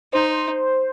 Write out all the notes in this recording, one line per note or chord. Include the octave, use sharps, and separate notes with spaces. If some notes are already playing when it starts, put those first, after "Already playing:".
D#4 C5
C5